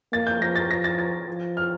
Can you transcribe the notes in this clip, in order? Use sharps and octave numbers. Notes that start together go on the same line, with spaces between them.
A#3 A6
G6
F3 A#6
A6
A#6
A6
A6
F3
F6